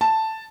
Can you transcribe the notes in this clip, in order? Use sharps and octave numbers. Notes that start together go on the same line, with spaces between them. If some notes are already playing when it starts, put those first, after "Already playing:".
A5